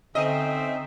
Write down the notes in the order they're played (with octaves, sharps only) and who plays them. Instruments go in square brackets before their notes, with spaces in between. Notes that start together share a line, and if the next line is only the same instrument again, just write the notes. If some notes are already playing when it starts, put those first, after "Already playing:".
[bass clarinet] D3 [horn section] C4 E5 [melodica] C#4 D#4 [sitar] D#5